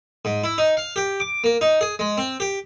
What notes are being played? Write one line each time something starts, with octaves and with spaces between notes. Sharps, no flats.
G#2
E4
D#4
F5
G4
D6
A#3
D#4
G#4
G#3
C4
G4